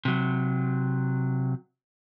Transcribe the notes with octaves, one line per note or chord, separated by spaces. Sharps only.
C3 F#3